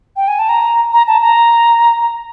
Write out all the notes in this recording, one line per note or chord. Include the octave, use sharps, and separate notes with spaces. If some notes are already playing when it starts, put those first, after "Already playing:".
G5
G#5
A5
A#5
A#5
A5
A#5